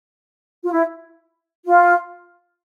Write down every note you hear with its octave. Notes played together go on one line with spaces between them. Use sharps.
F4
E4
F4